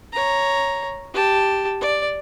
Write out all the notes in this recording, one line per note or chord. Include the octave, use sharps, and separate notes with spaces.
C#5 A#5
G4 A5
D5